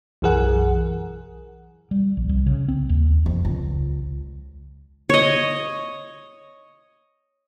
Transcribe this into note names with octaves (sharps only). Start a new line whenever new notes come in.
B1 F#2 E3 G#4 A#4 F#5
G3
A#1
C2
C#3
C4
D#2
F2
C#2
C#5 D#5